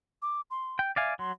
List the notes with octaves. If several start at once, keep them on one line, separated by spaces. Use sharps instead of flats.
D6
C6
G5
D5 E5 F5 G#5
F#3 C6